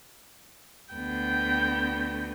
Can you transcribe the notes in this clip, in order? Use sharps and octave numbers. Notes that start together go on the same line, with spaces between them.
D2 B3 G5